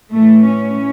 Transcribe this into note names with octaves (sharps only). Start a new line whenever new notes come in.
A2 E3 A3
C#4